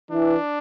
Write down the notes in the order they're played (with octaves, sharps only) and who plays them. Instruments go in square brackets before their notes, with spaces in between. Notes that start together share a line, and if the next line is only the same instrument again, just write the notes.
[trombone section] E3 [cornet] D4